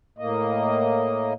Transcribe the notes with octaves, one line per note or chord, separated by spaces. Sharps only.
A2 A#3 D#5